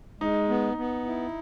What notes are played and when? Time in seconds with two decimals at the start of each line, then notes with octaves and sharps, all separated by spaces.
0.20 G#3 D#4
0.49 B3
0.77 B3
1.06 E4